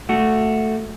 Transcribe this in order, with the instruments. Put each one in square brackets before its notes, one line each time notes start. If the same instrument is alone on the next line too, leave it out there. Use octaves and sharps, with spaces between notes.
[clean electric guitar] A3 F#4